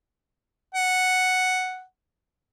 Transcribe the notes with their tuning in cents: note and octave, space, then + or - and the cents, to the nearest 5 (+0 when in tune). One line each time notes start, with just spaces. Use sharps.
F#5 +0